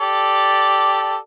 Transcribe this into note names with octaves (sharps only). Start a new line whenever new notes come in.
G4 A4 D5